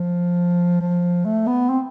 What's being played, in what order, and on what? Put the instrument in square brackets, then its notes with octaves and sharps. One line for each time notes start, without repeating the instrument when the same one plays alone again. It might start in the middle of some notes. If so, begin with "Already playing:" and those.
Already playing: [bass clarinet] F3
F3
A3
B3
C4